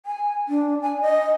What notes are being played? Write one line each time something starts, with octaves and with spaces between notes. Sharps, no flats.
G#5
D4
G#5
D#5